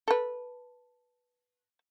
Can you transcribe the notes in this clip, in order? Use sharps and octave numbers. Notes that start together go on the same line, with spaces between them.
A4 B4